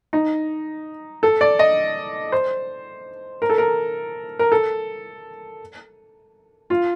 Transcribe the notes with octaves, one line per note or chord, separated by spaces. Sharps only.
D#4
A4
D5
D#5
C5
A#4
A4
A#4
A#4
A4
F4